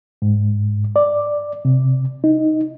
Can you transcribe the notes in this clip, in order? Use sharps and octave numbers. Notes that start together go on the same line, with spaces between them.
G#2
D5
C3
D#4